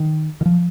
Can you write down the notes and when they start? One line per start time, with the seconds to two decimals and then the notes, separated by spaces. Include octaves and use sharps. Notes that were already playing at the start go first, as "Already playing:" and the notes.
Already playing: D#3
0.41 D#3
0.46 F3